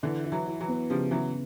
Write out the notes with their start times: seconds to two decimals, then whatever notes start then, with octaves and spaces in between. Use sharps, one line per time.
0.03 D3 E3 E4
0.24 E4
0.32 E3 F#3
0.46 E4
0.60 E3 F#3
0.68 B3
0.90 C#3 F3 G3
1.11 C#3 E3 F#3